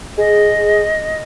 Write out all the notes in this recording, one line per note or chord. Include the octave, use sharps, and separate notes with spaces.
G#4 D#5